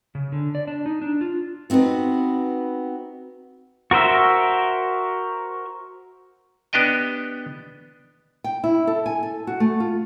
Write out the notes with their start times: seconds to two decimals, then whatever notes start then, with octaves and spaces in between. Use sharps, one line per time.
0.15 C#3
0.32 D3
0.55 D5
0.67 D4
0.86 D#4
1.02 D4
1.21 F4
1.70 B3 C4 D#4 F#4 B4
3.91 F#4 A#4 C5 E5
6.73 B3 D4 G4 D#5 G5
8.44 G5
8.64 E4
8.87 A4
9.06 G#5
9.23 A4
9.47 F#4
9.60 A3
9.80 F4